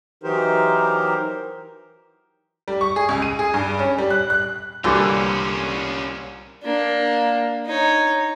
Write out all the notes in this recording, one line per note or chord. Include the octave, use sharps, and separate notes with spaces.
E3 F#3 D#4 G4 A#4 C5
G3
C#6
G#4
C#2
D#7
G#4
G2
C#4
G3
F#6
F#6
C2 D3 E3 G3 A3 A#3 C#4 F4
A#3 D4
D#4 C#5